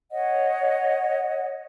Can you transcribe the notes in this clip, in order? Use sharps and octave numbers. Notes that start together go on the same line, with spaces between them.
C#5 D#5 F#5